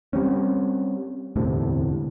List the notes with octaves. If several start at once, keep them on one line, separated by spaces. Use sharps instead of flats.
G3 G#3 C4 C#4
E1 D2 A2 C3